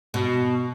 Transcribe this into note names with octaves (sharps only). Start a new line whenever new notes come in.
B2